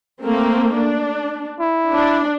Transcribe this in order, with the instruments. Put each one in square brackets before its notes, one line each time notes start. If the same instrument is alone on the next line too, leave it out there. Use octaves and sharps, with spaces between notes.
[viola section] A3 A#3 C4
D4
[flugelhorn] E4
[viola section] D4